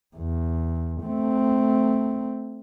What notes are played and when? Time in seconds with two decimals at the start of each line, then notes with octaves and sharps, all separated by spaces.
0.17 E2
1.03 A3 C4